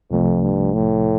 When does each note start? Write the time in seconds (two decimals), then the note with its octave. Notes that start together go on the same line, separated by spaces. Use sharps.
0.11 C2 F2 C3 F3 A3
0.42 G2
0.73 A2